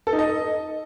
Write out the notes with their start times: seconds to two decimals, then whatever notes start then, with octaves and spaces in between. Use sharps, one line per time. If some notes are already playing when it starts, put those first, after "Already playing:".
0.07 A4
0.13 D#4
0.19 D#5